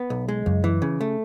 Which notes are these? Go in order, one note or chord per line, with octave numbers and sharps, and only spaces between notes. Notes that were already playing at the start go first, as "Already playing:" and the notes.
Already playing: B3
B1
G#3
C#2 F#2
E3
C#3
A3